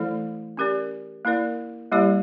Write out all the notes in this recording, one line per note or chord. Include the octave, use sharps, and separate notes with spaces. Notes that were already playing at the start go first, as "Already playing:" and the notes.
Already playing: E3 A3 E4 A4 D5
C#4 G4 A#4 D5
A#3 E4 A#4 D5
G3 A#3 E4 G4 D5